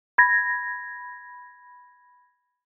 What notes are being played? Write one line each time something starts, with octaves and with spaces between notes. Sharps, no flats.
B5 G#6 A#6